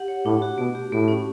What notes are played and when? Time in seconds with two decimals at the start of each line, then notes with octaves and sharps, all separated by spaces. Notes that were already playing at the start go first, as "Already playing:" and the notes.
Already playing: G4 F#5
0.08 C#5
0.25 A2 D4
0.42 F#4
0.58 B2 A3
0.75 G4
0.92 A2 A3
1.08 C#4